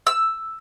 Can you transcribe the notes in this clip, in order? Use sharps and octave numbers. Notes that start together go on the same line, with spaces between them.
E6